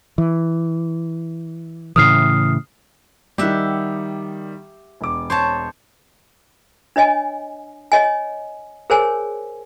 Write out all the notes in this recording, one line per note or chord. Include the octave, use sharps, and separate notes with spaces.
E3
A2 C#3 E3 D#6 F6 C7
D#3 G3 G4 E5 F#5
E1 D6
C5 C#5 A5
D4 C#5 D#5 G#5
C#5 D#5 G#5
G#4 A#4 C5 C#5 G#5